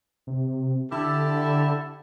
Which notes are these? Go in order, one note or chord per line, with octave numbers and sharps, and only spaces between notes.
C3
D3 E4 G4 A4